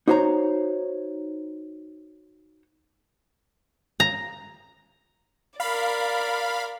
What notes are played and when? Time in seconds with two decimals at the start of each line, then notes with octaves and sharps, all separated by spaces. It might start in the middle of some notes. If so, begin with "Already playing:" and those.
0.08 D#4 F#4 C5 C#5 A#5
4.00 A#5
5.60 A#4 D5 F5 B5